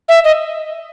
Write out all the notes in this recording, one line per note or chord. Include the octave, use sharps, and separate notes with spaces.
E5
D#5